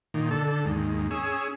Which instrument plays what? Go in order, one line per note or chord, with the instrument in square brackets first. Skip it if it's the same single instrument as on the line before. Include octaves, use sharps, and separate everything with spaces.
[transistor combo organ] A#2 D#3
D3 A4
D#2 G#2
C#4 G#4 E6